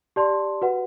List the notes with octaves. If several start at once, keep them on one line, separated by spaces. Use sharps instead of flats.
G4 D5 A5 C6
F#4 B4 F#5